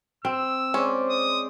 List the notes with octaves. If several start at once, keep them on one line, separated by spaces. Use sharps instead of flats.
C4 E6
G#3 C#4 C5 D5
D#6